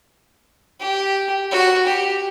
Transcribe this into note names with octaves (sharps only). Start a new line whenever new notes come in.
G4
F#4
G4